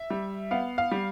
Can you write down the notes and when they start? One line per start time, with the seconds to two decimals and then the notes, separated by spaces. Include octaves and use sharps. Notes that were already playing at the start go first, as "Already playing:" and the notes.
Already playing: E5
0.10 G3
0.51 B3 F5
0.78 F5
0.91 G3